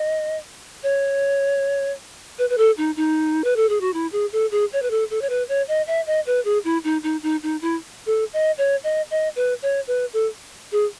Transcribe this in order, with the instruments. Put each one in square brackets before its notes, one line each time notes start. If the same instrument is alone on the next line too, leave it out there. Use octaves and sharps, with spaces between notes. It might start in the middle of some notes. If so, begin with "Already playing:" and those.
Already playing: [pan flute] D#5
C#5
B4
B4
A4
D#4
D#4
B4
A4
G#4
F#4
E4
G#4
A4
G#4
C#5
B4
A4
A4
C#5
B4
C#5
D#5
E5
D#5
B4
G#4
E4
D#4
D#4
D#4
D#4
E4
A4
D#5
C#5
D#5
D#5
B4
C#5
B4
A4
G#4